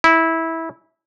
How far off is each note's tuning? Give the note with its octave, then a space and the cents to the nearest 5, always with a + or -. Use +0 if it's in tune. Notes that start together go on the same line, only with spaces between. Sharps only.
E4 -15